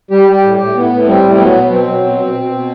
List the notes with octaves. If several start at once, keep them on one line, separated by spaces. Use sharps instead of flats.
G3 G4
G3
G4
A2
G4
A2
A2 B3
A2
B3
G3 C4
A2
C4
F#3 B3
B2
F#3 C4
F#3
B2
B2
B2
B2